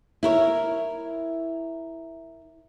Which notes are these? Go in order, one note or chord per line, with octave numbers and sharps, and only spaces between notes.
E4 A#4 C#5